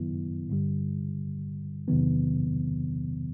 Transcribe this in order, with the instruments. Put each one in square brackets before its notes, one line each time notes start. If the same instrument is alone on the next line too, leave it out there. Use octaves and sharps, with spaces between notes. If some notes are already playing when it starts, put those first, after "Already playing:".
Already playing: [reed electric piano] F#2 D#3 F#3 B3 E4
G2 D3 G3
E2 C3 D#3 F#3 B3